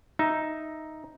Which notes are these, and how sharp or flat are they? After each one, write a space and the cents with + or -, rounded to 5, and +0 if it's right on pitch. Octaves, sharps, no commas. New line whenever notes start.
D#4 +0 E5 +0